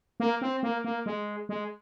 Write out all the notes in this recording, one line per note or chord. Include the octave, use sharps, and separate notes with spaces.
A#3
C4
A#3
A#3
G#3
G#3